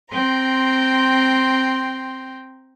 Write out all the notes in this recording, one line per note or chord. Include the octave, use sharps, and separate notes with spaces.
C4 G5 A#5 C6